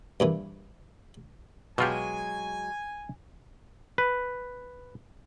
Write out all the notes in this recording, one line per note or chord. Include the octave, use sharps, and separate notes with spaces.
G2 A#2 E3
B2 F#3 G#3 F4 G4 G#5
B4